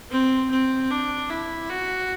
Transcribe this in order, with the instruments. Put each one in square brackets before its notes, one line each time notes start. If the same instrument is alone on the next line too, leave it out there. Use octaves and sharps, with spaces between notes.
[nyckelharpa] C4
C4
D4
E4
F#4